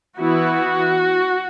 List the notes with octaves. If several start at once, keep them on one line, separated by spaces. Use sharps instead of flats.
E3 B3 E4 F#4